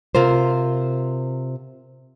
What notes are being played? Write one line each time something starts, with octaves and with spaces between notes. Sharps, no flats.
C3 F4 A#4 C5